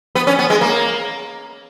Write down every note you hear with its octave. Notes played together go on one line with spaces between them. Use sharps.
B3
C#4
B3
G#3
A#3